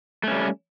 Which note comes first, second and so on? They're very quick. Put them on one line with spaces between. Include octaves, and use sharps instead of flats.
A3 C#4 G3